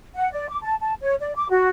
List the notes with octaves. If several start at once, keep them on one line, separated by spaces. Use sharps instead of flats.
F#5
D5
D6
A5
A5
C#5
D5
D6
F#4